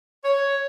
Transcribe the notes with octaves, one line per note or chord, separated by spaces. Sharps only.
C#5